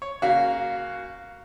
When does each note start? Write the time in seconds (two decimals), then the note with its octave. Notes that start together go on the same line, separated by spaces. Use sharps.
0.02 C#5
0.22 C#3 A#3 F#4 F5